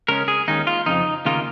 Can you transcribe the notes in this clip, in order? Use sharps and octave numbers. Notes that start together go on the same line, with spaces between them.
C#3 G#3 C#4 A#4
G#4
D#2 D#3 G#3 C#4 D#4
F4
F2 C#3 F3 D#4
D#2 C#3 A#3 D#4 F4